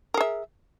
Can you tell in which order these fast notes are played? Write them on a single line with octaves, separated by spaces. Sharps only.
A#4 G#4 E5